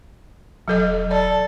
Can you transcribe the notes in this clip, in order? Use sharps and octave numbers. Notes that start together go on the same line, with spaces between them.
E1 F#3 A4 D#5
A4 D5